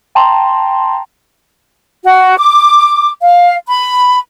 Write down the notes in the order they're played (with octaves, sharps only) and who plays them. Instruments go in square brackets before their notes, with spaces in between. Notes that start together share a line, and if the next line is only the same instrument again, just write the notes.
[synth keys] G5 A5 A#5 C6
[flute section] F#4
D6
F5
B5